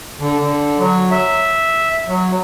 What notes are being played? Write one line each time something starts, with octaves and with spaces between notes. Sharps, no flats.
D3
D3
F#3
E5
F#3